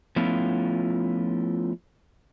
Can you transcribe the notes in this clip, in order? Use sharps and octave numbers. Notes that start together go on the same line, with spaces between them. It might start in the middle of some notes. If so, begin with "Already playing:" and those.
F3 A3 B3 C#4 E4 F4